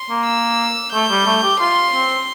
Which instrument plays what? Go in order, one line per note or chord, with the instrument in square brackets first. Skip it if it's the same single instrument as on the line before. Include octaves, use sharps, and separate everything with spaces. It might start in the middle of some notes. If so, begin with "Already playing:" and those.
Already playing: [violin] C6
[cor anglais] A#3
[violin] E6
[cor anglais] A3 [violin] G6
[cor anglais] G3
A3
G4
[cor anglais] F4 [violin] C6
[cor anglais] C4